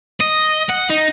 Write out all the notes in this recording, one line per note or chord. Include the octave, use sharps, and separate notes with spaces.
D#5
F#5
D#4